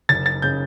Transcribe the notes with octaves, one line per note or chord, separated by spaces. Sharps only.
F#1 A6
A6
C#3 G6